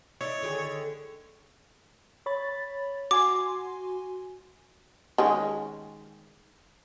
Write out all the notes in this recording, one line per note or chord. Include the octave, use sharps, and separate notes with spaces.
D#4 E4 C#5 D5
D3 D#3 G#4
C#5 B5 A6
F#4 G#5 C6 D6
D#3 G#3 C#4